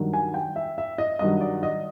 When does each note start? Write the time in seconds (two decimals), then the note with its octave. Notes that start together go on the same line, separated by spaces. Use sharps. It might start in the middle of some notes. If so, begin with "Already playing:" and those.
Already playing: G2 D#3 F#3
0.13 G#5
0.34 G5
0.56 E5
0.78 E5
0.98 D#5
1.19 G2 D#3 F#3 D#5
1.41 D5
1.63 D#5